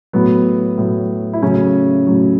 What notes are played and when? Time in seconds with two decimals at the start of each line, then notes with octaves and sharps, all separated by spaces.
0.13 A2 F#3 B3
0.78 A2 F#3
1.33 E4
1.42 A2 C#3 F#3 C#4
2.07 A2 F#3